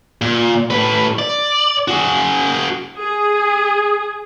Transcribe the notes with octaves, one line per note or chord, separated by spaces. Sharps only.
A#2
A2 B4
D5
F#4 G#4
G#4